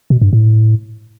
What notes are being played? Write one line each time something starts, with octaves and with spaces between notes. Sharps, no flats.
B2
G2
A2